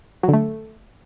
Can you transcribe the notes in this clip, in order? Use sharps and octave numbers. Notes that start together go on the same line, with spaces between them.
F#3
D3
A3